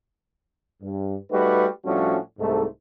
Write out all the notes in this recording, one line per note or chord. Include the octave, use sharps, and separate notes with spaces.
G2
G3 A3 D#4 F#4 B4
A2 F3 G3 C#4 D4 F#4
C2 G#2 A3